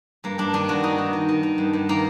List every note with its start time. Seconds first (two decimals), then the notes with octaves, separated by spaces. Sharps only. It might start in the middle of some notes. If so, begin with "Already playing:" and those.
0.24 G2 A#3
0.38 G2 D4
0.53 D#3 D4
0.68 G2 F#4
0.83 D#3 D#4
0.98 D#3
1.13 D#3
1.29 D#3
1.43 D#3
1.58 G2
1.73 G2
1.89 D#3 A#3